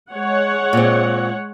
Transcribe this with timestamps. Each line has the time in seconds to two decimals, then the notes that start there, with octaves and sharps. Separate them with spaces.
0.14 G#3 C#5 F#5
0.73 A#2 C4